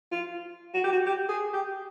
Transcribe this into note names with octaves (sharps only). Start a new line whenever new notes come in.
F4
F#4
G4
F#4
G4
G#4
G4